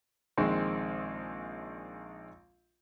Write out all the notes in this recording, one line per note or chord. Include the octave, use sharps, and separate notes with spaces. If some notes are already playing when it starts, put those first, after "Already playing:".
A#1 D#3 G#3 C4 C#6